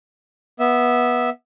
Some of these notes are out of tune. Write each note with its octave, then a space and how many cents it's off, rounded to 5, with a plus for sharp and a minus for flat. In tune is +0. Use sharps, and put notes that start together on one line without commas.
B3 -15 E5 -10